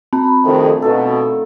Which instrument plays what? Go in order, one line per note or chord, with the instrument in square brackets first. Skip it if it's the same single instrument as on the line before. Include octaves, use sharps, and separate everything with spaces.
[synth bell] C4 [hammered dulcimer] A#5 B5
[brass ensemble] F2 C3 D#3 [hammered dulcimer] A3 D4 G#4
[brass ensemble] B2 [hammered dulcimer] D#3 F3 A4